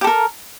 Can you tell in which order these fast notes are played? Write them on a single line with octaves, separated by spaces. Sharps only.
G4 A4 A#4